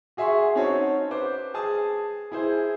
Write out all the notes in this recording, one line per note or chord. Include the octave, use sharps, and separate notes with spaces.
F#4 G#4 E5 G#5 C6 C#6
C4 C#4 D#4 F#4 C#5 A5
B4 C5 D6
G#4 A5 D#6
E4 G#4 C5